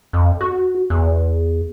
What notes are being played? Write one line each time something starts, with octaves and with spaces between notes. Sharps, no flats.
F2
F#4
E2